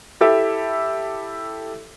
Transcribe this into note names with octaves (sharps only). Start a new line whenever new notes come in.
E4 G4 A4 E5